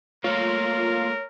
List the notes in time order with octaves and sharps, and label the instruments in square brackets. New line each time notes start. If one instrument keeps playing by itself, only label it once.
[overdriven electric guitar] A3 A#3 [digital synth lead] F4 [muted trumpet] A#4 [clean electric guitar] C#5